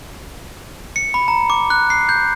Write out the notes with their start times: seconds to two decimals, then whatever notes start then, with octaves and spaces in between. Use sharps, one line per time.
0.96 C#7
1.14 B5
1.28 A#5
1.50 D6
1.70 F#6
1.90 C7
2.09 G6